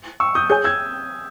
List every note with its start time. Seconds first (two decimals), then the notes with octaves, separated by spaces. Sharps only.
0.20 C#6 E6
0.35 D#6 G6
0.50 G#4 C#5 G#5 D#6 G6
0.64 E6 G#6